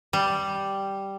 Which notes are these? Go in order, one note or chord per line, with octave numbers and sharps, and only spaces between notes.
G3